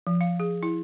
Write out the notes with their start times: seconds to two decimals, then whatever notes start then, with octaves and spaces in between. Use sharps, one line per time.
0.07 F3
0.21 F5
0.40 G#4
0.63 E4